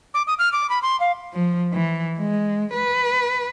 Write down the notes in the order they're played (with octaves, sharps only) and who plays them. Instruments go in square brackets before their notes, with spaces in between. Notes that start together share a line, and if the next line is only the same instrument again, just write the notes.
[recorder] D6
D#6
F6
D6
B5
C6
F5
[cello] F3
E3
G#3
B4